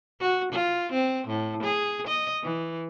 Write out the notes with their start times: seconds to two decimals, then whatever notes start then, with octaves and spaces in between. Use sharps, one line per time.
0.20 F#4
0.52 F4
0.93 C4
1.27 A2
1.63 G#4
2.07 D#5
2.42 E3